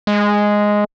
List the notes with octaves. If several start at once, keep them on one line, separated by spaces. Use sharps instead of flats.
G#3